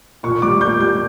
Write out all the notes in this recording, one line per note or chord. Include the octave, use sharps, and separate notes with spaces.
A#2 C#6
G3 D6
A#2 G6
G3 G6